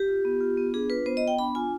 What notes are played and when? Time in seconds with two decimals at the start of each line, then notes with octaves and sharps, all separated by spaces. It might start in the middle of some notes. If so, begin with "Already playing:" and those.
Already playing: G4
0.08 F4
0.25 B3
0.41 F4
0.57 B3
0.74 D4 G#4
0.90 F4 B4
1.06 B3 C5
1.17 D#5
1.22 B3
1.28 G5
1.39 D4 B5
1.55 F4 G#5